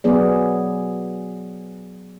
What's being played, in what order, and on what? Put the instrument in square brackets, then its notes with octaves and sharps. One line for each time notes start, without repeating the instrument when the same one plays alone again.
[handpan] F#3 B3 G#4 D5